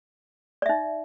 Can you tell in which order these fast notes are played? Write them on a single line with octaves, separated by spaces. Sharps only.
D5 E5 D#4